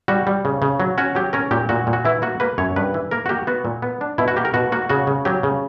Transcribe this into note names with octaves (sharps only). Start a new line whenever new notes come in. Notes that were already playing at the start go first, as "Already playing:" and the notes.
G3 F#4
G3
C#3
C#3
F#3
C#4 F#4
F#3 G4
C#4 A#4
A#2 G4
A#2 F#4
A#2
F#4
E3 E4
A#3 F#4
A#3 B4
F#2 C#5
G2 B4
E3
A#3 A#4
F#4
A#3 G4
B3 F#4
A#2
B3
D4
B2 E4
F#4
A#3 G4
A#4
B2 F#4
A#3 F#4
C#3 F#4
C#3
F#3 G4
C#3